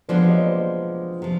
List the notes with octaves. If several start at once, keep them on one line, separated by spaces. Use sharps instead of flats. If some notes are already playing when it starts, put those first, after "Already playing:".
F3 G#3 B3 D4 C5 D5
C#5 D#5
C5 D5
C3 F3